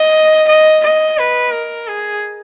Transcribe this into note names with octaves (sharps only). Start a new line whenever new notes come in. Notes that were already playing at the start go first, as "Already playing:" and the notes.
Already playing: D#5
D#5
D#5
B4
A#4
G#4